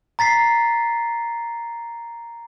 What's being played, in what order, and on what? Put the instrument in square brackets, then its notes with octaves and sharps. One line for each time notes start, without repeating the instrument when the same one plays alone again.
[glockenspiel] A#5 A6 B6 C7